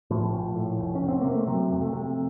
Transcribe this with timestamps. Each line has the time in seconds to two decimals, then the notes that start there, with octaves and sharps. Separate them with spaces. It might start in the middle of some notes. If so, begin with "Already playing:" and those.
0.10 A2 F3
0.33 A#1
0.56 A2
0.79 F1
0.95 C#4
1.02 F1
1.08 C4
1.22 C3 A#3
1.34 A3
1.47 C3 F#3
1.71 F2
1.81 A3
1.93 C3